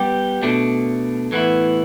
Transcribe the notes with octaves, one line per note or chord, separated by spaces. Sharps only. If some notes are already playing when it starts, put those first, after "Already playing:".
Already playing: G3 B3 G4
B2 A3 D4
A2 E3 B3 E4